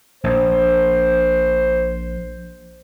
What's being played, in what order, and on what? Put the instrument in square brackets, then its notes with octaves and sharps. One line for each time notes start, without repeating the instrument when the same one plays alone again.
[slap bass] A#1 [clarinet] C5